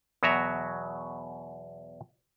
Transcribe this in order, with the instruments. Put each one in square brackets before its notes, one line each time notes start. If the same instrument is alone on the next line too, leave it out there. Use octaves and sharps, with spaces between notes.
[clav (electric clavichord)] E2 B2 F#3 F#4 E5 A#5